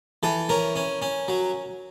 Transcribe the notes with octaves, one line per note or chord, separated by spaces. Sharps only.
E3 A4
C#4 A#4
C#4
C#4
F#3